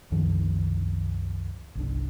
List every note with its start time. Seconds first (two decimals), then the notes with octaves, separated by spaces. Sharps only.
0.11 C2 F#2 D#3 F3
1.75 G1 C2 D4